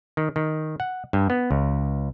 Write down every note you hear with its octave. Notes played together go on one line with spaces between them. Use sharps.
D#3
D#3
F#5
G2
B3
C#2